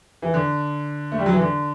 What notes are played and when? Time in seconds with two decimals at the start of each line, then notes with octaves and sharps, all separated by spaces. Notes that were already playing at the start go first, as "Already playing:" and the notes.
0.22 E3
0.34 D3
1.12 A3
1.19 G3
1.26 F#3
1.33 E3
1.41 D3